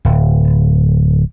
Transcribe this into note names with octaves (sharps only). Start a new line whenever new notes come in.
D1